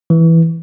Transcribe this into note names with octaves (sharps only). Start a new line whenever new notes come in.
E3